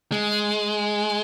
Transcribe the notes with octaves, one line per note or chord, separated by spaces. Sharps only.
G#3